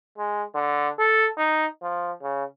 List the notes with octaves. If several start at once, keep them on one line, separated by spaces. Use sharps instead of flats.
G#3
D3
A4
D#4
F3
C#3